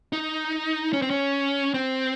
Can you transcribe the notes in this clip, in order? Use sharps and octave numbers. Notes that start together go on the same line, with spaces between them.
D#4
C#4
C4
C#4
C4